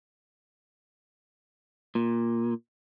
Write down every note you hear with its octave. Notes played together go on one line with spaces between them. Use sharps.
A#2